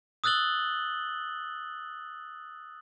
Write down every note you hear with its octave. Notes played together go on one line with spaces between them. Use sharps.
D#6 E6 F#6 A6 F#7 G7